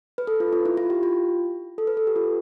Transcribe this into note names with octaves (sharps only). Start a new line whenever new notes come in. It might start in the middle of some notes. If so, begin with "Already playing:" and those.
B4
A4
F4
F4
E4
F4
G4
F4
A4
B4
A4
G4
F4